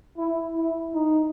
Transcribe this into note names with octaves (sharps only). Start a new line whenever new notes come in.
E4
E4
D#4